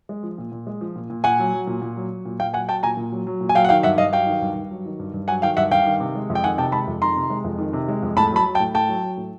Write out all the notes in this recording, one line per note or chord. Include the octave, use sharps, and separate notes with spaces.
G#3
F3
A#2
A#2
G#3
F3
A#2
A#2
A#2 F#5 G#5
F#3
F#3
A#2
A#2
F#3
F#3
A#2
A#2 F5 G5
F#3 F#5 G#5
F#3 G5 A5
A#2 G#5 A#5
A#2
F#3
F#3
A#2
G#5
F#3 F5 G5
F#5
D#3 F5 G5
G2 E5 F#5
G2 D#5 F5
F#3 F5 G5
D#3
G2
G2
F#3
D#3
G2
G2
F#3 F#5 G#5
D#3 F5 G5
G2 E5 F#5
G2 F5 G5
D#3
C3
G#3
F2
G5
D#3 F#5 G#5
C3 G5 A5
G#3 A5 B5
F2
D#3 A#5 C6
C3
G#3
F2
D#3
C3
G#3
F2
A2 A5 B5
F#3 A5 B5
F#3
G5 A5
A2
A2 G5 A5
F#3
F#3
A2